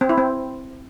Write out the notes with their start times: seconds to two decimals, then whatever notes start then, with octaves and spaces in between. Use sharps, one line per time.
0.01 C4
0.09 E4
0.18 C4